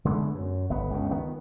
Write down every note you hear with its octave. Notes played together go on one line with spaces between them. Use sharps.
D3 G#3 A3 B3
F#2
G1 B3
C#2 G2 C#3
D#3 B3